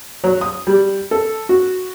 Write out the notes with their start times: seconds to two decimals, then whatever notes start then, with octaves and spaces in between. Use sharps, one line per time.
0.24 F#3
0.41 D#6
0.67 G3
1.11 A4
1.49 F#4